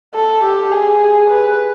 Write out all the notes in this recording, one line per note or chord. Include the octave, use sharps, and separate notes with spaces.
A4
G4
G#4
B4